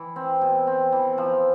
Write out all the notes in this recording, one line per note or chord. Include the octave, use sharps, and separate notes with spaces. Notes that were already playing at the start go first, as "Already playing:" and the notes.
Already playing: E3
C4
B2
C4
E3
F3